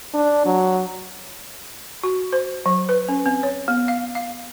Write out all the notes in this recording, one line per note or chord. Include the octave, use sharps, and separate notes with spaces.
D4
F#3
F#4
C5
F#3
B4
C#4
C4
C#5
B3
F5
F5